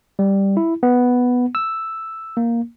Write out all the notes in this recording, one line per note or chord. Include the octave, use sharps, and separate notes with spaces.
G3
E4
B3
E6
A#3